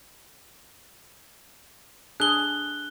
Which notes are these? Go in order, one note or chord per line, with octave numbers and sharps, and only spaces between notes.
D4 G#4 F#6 G7